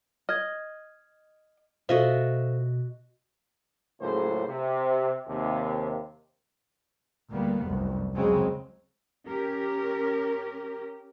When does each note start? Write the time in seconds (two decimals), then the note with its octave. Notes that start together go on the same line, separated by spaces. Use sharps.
0.29 D#5 F6 G#6
1.89 B2 F4 F#4 A4 C5 D#5 E5
4.00 C#2 A2 C#3 F#3 A#3 C5
4.47 C3
5.27 D#2 C3
7.31 D2 G3 A#3 B3
7.64 F1 C2 F#2
8.13 C#2 C#3 F#3 G#3 C4
9.27 C#4 G4 A#4